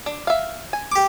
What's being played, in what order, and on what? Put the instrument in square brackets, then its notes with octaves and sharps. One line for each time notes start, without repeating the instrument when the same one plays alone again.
[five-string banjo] D4
E5 F5
G#5
[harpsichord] G4 D6